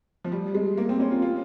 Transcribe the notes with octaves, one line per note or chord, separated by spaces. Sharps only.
F3
G3
G#3
A#3
C4
C#4
F4
F4